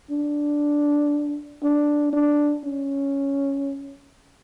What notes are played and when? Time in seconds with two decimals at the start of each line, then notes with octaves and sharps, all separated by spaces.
0.10 D4
1.63 D4
2.13 D4
2.64 C#4